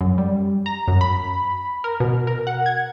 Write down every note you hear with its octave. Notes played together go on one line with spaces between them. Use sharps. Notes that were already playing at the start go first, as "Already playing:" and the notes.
F#2
G3
A#5
F#2
B5
A#4
B2
A#4
F#5
G#6